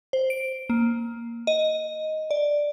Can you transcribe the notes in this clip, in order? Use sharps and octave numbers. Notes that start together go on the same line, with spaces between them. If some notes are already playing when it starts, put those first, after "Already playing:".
C5
D7
A#3
D#5
D5